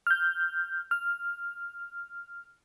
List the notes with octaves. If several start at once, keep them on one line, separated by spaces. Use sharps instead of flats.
F6 G6
F6